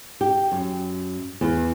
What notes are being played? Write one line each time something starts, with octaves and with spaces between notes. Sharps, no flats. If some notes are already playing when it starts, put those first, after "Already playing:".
G4
F#2
E2